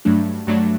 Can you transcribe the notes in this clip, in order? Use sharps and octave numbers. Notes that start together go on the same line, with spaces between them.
G2 F#3 A3 D4
G2 F#3 A3 D4